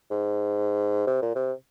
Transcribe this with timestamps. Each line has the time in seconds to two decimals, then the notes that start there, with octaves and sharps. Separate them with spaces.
0.11 G#2
1.07 C3
1.22 A#2
1.35 C3